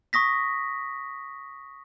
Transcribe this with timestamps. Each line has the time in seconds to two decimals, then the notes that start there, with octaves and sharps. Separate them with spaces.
0.13 C#6 D#6 A#6 B6